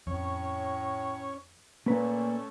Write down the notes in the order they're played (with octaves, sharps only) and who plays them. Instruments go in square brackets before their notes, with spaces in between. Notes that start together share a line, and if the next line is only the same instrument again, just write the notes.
[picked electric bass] F2 [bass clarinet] A2 [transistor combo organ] C#4 C#5
[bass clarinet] A#2 [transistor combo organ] A3 C#4 [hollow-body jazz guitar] A#3 B4 A#5